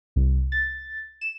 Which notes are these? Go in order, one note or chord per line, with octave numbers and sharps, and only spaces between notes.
C2
A6
E7